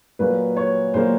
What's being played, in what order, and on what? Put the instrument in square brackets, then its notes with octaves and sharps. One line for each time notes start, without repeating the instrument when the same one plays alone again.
[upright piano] A#2 F#3 A#3 B4
C#5
A#2 F#3 A#3 C5